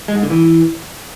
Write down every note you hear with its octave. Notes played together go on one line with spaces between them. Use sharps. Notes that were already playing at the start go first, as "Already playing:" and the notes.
G#3
G#2
D3
E3